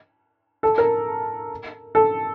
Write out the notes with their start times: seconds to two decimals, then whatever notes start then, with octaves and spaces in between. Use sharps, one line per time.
0.63 A4
0.78 A#4
1.95 A4